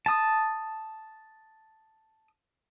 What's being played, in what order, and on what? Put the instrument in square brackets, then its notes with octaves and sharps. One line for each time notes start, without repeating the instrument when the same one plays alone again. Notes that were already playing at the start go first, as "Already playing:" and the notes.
[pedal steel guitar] A5 D#6